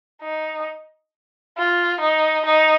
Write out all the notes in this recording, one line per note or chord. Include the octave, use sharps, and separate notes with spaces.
D#4
F4
D#4
D#4